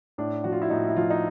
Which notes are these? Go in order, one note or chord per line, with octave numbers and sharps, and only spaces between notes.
A2 D4
F3 F#4
F4
E4
A2 D#4
E4
F3 F4
D#4